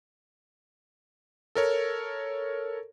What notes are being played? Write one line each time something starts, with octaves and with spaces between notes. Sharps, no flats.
A4 A#4 C#5